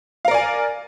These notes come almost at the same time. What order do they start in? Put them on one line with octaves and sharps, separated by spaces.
F5 A#4 D5 G#5